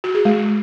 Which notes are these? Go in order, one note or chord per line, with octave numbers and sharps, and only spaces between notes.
F#4
G#4
G#3